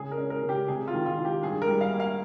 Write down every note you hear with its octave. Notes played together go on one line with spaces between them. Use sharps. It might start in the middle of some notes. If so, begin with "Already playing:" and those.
Already playing: C#3 G#4
A#4
C#4
A#4
C#3
G4
C3 G#4
F4
D#3
F4
D#3
G4
G2 G#4
A#4
G3
F5
A#3
F5